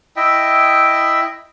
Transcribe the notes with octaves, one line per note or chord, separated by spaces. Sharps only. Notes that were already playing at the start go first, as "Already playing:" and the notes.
E4 D#5 E5 G5